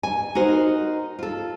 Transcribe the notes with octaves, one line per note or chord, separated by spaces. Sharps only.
G#5
D#4 F#4 A#4 C5
F4 A4